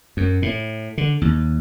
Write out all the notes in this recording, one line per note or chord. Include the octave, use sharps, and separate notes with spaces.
F#2
A2
D3
D#2